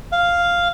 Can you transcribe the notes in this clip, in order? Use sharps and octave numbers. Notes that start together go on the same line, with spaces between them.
F5